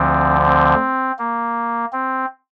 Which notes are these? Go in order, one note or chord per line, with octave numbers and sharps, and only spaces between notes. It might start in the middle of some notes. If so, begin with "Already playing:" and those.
Already playing: D2 D3 F3 C4
C4
A#3
C4